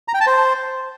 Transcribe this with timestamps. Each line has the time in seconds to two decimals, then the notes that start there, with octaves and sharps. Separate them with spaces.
0.08 A#5
0.14 G5
0.21 A5
0.27 C5